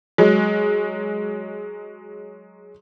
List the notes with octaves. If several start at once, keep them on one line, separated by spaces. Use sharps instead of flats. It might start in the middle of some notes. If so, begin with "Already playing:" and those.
F#3 G#3